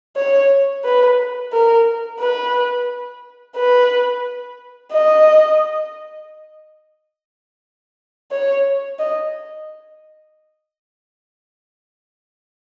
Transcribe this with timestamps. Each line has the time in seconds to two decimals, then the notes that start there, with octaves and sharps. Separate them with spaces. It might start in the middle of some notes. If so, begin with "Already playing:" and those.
0.17 C#5
0.85 B4
1.52 A#4
2.20 B4
3.56 B4
4.92 D#5
8.31 C#5
8.99 D#5